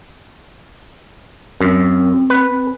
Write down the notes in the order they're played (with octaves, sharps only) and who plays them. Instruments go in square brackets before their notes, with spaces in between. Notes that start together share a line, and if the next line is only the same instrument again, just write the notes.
[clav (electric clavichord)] F#2 [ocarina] C4
[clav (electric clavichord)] B4
[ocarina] C4